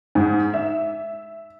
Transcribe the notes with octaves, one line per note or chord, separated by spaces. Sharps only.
G#2
E5